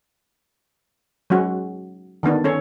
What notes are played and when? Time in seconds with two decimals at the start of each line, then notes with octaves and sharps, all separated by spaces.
1.30 F#3 G#3 C#4 F#4
2.23 D3 D#3 B3 D4
2.44 C#4 A4 C#5